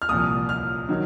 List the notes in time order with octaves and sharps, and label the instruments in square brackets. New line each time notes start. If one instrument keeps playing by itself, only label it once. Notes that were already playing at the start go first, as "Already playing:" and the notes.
[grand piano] F6
C2 A#2 F3 D#6
F6
D#3 F#3